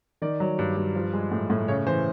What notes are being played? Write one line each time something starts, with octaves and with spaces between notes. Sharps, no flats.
D#3 D5
F#3
G2
G2
F3
G#3
A2
A2
C#3 C#5
E3 C5